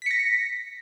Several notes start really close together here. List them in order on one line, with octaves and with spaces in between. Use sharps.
B6 C#7 A#6